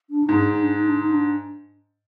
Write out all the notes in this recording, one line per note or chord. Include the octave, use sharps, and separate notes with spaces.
D4
D#4
G#2
D4
D#4
D4
D#4
D4
D#4
D4